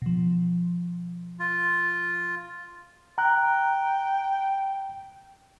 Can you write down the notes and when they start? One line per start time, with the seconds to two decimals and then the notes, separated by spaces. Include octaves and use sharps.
0.02 B2 F3
1.40 F4
3.18 G5 A#5 F#6